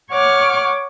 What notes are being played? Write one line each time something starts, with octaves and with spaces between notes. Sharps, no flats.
C#5 F#5 C#6 D6 F6